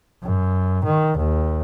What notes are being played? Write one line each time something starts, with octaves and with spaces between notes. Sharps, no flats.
F#2
D#3
D#2